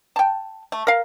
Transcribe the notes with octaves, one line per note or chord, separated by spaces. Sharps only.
G5 A5
A3
A#4 F5